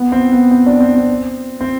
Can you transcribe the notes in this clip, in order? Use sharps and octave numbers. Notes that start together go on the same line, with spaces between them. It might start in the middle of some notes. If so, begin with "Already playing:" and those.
Already playing: B3
C4
B3
C4
D4
C4
C4
C4